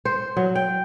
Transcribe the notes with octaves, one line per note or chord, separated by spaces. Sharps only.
C5
F#3
G5